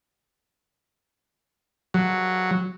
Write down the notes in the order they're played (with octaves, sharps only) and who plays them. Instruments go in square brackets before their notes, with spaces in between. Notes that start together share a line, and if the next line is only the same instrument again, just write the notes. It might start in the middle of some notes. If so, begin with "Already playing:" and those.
[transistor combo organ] F#3